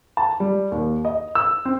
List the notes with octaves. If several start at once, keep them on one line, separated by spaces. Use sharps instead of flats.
A5
G3
D#2
D#5
E6
C4